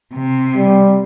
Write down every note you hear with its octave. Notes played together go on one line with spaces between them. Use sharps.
C3
G3